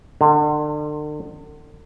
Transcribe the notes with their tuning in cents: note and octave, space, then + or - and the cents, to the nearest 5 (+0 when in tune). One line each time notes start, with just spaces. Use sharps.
D3 +40